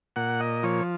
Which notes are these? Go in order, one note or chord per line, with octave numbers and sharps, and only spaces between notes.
A#2 F#5
D#5
F3 C#5